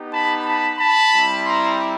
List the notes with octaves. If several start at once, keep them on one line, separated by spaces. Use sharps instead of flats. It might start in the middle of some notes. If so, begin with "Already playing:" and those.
Already playing: B3 D#4 G4
A5 B5
A5 B5
A5 B5
G3 C4 E4
A#5 C6